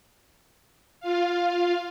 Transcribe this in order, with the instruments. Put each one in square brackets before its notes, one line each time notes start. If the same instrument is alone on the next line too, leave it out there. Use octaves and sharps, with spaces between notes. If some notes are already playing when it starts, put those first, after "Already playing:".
[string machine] F4 F5